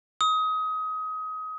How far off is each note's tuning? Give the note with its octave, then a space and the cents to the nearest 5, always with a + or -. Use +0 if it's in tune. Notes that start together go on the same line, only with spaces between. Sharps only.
D#6 +25